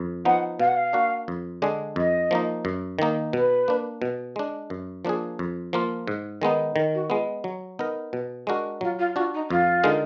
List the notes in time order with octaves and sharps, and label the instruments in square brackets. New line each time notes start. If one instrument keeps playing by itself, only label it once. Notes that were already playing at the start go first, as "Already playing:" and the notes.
Already playing: [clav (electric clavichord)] F2
[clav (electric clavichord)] F3 B3 D#4 [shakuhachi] F#5
[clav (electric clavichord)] B2 [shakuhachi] F5
[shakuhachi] F#5
F5
[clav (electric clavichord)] A#3 D4 F#4
F2
D3 G#3 D4 G#4
[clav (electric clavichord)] F2 [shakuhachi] D#5
[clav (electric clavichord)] F3 A#3 D#4
F#2
D#3 A#3 D#4
[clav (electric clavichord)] B2 [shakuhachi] B4
[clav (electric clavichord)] A#3 D4
B2
G#3 D4
F#2
F3 A#3 D4 G#4
F2
F3 A#3 F4
G#2
D#3 G#3 B3 D#4
[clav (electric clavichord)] D#3 [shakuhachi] A#4
[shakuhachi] F#4
[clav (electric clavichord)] G#3 B3 [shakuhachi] F4
[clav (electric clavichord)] F#3
B3 D#4 A#4
B2
G#3 D4 F#4 A#4
[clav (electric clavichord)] F#3 [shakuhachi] F4
[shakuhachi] F4
[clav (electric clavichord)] D4 F#4 [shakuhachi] F4
[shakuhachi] D#4
[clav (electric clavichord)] F2 [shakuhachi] F4
[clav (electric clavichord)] D3 G#3 D#4 A#4